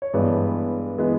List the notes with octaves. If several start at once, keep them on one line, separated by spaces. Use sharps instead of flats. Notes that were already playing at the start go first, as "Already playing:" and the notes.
C#5
G2 E3 G#3 B3 D5
E3 G#3 B3